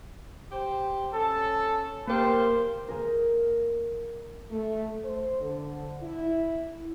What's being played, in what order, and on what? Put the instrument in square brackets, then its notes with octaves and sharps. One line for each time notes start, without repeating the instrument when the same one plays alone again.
[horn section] G4 C5
[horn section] C#4 A5 [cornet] A4
[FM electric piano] A#3 A#4 [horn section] G4 F5 [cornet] C5
[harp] A#3 G#4 A#4
[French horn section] A3
C5
D3
E4